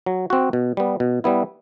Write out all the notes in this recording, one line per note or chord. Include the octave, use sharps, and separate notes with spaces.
F#3
C4 F#4
B2
G3 B3
B2
G3 B3 E4